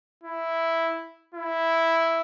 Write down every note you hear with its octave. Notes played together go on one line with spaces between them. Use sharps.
E4
E4